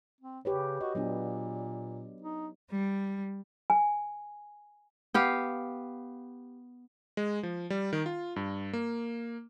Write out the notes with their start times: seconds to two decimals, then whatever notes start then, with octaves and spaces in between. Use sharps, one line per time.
0.21 C4
0.45 C#3 G4 B4 C#5
0.81 F#4 D#5
0.95 A#2 F#3 B3 D4
2.22 D#4
2.70 G3
3.70 G#5
5.14 B3 G4 F5
7.17 G#3
7.43 F3
7.70 G3
7.93 D#3
8.06 F4
8.36 G2
8.73 A#3